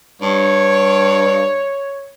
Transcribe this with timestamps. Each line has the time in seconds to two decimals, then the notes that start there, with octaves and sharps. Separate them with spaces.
0.22 G2 C#5